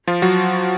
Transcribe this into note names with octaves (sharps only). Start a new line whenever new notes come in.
F3 F4
F#3 F#4